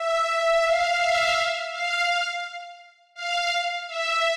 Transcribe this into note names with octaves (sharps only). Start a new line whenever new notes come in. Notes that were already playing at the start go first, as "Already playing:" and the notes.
Already playing: E5
F5
E5
F5
F5
E5